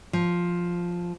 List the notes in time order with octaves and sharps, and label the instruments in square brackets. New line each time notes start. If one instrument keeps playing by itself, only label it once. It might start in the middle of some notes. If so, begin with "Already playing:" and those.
[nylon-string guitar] F3